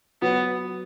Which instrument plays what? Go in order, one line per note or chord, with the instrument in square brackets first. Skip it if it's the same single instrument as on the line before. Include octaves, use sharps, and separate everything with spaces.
[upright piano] F#3 [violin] B3